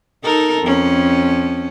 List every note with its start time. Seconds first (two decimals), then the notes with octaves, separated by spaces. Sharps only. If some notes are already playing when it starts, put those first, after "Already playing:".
0.24 D#4 A4 A#4
0.62 F2 C#4